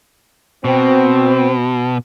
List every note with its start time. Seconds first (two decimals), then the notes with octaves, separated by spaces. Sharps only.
0.65 B2 C4